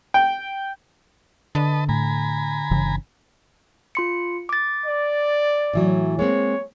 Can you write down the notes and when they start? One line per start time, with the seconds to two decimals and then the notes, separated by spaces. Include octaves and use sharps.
0.14 G5
1.55 D3 B4 D#5 A5
1.89 A2 G#5 A#5 B5
2.71 G1 C#3 E3
3.95 F4 C6 C#7
4.49 D6 A6
4.86 D5
5.73 A2 E3 F#3
6.19 G#3 A#3 C4 C#5